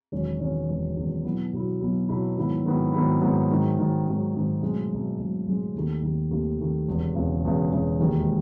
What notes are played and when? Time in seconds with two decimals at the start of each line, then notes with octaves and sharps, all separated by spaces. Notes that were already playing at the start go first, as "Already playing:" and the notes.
0.12 E1 E2 D#3 F#3 C#4
0.40 E1 E2 D#3 F#3 C#4
0.69 E1 E2 D#3 F#3 C#4
0.97 E1 E2 D#3 F#3 C#4
1.25 B1 B2 F#3 B3 E4
1.53 B1 B2 F#3 B3 E4
1.80 B1 B2 F#3 B3 E4
2.09 B1 B2 F#3 B3 E4
2.37 G#2 D#3 F#3 B3 E4
2.65 G#2 D#3 F#3 B3 E4
2.93 G#2 D#3 F#3 B3 E4
3.21 G#2 D#3 F#3 B3 E4
3.50 G#2 D#3 F#3
3.78 G#2 D#3 F#3
4.06 G#2 D#3 F#3
4.34 G#2 D#3 F#3
4.62 B1 A2 G#3
4.90 B1 A2 G#3
5.19 B1 A2 G#3
5.47 B1 A2 G#3
5.74 D#2 D#3 A3
6.03 D#2 D#3 A3
6.31 D#2 D#3 A3
6.59 D#2 D#3 A3
6.88 E1 E2 C#3
7.15 E1 E2 C#3
7.44 E1 E2 C#3
7.71 E1 E2 C#3
7.99 E1 D#2 D#3 G#3